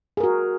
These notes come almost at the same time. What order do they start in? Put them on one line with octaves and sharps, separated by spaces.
G#4 A#4 F#4